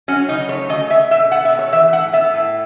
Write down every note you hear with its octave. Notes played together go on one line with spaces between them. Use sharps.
F#3 C#4
C#3 D#4
A3 C#5
C#3 D#5
G#3 E5
B2 E5
B3 F#5
E5
B2
C#5
E3 E5
A2 F#5
B3 E5
A2